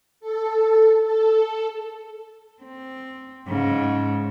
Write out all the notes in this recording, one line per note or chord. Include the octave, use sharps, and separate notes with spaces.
A4
A4
C4
G#2 C#3